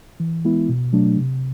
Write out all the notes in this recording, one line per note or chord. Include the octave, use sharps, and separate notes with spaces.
E3
G#3 B3 E4
B2
F#3 A3 D4
C3